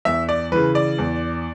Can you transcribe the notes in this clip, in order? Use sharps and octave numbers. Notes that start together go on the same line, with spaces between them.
E2 E5
D5
C#3 E3 B4
D5
E2